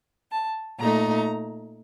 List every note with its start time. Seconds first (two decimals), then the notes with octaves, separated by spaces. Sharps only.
0.31 A5
0.78 A#2 A3 D#4 A#5